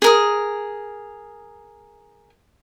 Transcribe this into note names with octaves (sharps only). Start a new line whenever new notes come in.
G#4 A#4 D#6